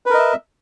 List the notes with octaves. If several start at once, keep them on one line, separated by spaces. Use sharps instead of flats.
A#4 B4 D#5 E5